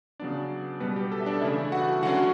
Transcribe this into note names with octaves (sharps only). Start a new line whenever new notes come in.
C#3 F#3 B3 D4 D5
B2 G3 B3 B4
G4
A4
E5
D4 D5
C#3 E3 A3 D4 E4 E5
F#4 F#5
D3 F#3 C#4 F#4 F#5